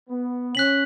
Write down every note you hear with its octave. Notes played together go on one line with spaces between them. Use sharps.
B3
C#4 F#6 B6 F#7